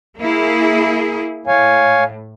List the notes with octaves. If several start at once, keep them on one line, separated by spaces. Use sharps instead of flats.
A#3 E4 G#4
A2 C#5 F5 G#5